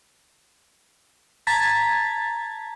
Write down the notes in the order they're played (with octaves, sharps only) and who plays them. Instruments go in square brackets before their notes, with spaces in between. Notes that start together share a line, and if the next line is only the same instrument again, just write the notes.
[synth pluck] A5 A#5 G#6 A6 B6